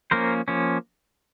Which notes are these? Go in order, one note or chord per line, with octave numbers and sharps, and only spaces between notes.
F3 A#3 C#4 A#4 C5
F3 A#3 C#4